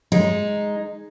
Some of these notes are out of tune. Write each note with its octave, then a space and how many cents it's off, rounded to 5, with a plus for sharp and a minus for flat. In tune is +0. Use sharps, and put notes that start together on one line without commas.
G#3 +0 D#4 +0